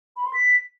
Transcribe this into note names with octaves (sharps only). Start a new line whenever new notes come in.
B5
C6
B6